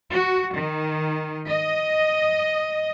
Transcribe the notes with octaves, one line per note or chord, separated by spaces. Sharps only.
F#4
D#3
D#5